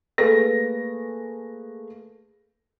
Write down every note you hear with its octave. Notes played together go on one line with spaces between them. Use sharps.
A3 A#3 G#4 B4 A#6